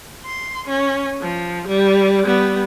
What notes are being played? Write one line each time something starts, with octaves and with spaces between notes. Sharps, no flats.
C6
C#4
F3
G3
G3 B3